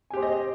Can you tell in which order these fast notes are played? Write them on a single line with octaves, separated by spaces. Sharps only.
G#5 G4 C5 G#4 D#5